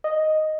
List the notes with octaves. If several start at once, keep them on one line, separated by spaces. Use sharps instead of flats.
D#5